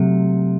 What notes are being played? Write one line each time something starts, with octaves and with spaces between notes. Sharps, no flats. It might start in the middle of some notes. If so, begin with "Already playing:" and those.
Already playing: C3 F#3 A3